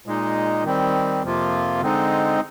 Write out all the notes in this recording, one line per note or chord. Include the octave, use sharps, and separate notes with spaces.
A#2 G#3 D#4
D#3 G3 C4
F2 C3 F3 A#3 F4
D3 G#3 C4 D#4